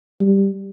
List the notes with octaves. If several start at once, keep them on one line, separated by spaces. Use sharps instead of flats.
G3